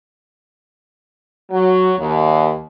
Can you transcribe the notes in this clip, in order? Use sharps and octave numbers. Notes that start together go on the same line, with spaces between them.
F#3
D#2